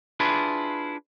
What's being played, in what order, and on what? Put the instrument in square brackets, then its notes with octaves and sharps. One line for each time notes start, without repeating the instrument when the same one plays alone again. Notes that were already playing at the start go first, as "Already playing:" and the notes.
[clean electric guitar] D4 E4 F4 G#4 B4